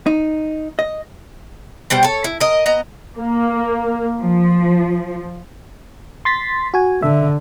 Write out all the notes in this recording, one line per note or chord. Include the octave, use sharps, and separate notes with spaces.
D#4
D#5
B2 G3 C5 G5
A4 C#5
E4
A#4 D#5
B3 D#5 A#5
A#3
F3
C6 A6 B6
F#4 G#5
D3 E5